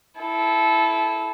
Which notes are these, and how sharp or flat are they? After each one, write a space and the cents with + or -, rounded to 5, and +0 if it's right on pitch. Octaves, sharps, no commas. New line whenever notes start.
E4 +0 A4 -20